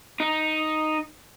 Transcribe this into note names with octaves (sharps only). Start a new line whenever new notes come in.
D#4